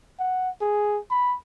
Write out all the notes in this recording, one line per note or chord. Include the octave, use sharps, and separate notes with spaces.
F#5
G#4
B5